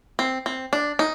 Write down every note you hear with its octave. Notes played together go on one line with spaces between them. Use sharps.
C4
C4
D4
D#4